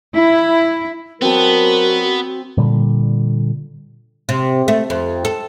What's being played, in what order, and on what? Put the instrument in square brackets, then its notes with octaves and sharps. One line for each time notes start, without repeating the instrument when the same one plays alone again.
[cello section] E4
[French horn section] F#3 A#4 [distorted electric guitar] B3 [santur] C4 A5 [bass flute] F#4
[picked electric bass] A#2 D3 G3
[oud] C3
A3
F2
A4